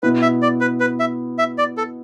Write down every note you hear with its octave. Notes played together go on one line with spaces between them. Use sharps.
B2 B3 E4 B4
E5
D5
B4
B4
E5
E5
D5
A4